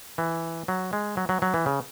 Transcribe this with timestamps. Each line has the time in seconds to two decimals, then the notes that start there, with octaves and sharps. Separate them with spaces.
0.18 E3
0.68 F#3
0.93 G#3
1.17 F#3
1.29 F#3
1.42 F#3
1.54 E3
1.66 C#3